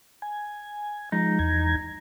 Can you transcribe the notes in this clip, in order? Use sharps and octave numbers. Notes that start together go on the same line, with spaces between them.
G#5
F3 G#3 D#4
E2 G#6